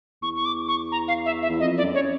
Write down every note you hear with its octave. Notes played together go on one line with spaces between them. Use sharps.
E2 C#6
C#6
D6
C#6
A#5
F5
E5
E5
E2
F2 D#5
D5
F#2
C#5